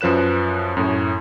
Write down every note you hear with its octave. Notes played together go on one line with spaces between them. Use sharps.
F#2 F3 B4 F#6 E7
F#2 A2